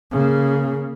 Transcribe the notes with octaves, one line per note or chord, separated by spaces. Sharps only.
C#3 A#3